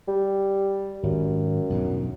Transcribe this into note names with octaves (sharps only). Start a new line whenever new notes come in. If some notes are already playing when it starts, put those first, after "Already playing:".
G3
G#1 F#2
B1 E2 G2